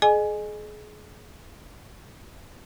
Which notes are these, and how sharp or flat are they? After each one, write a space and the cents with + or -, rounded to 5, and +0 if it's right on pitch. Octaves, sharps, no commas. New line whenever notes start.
G#4 +30 D#5 -30 G#5 +0